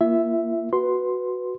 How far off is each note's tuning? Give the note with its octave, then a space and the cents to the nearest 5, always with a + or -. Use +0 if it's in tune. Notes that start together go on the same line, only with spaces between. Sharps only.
A#3 +5 F4 -45 E5 +0
F#4 +0 B4 +0 C6 +0